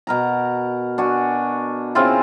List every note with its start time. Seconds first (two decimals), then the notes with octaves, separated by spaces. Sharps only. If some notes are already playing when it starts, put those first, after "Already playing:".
0.07 B2 A#4 A#5
0.98 D4 F#4 G#5
1.95 C#3 C4 E4 F4